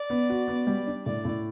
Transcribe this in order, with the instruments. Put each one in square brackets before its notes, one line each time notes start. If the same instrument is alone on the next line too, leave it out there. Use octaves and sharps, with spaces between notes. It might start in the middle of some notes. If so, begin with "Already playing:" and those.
Already playing: [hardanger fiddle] D5
[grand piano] B3
F#4
B3
G3
D4
[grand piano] A2 [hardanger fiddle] D5
[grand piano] A2